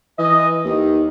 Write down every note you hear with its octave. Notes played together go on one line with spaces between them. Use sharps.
E3 D#5
D#2 D#3 D#4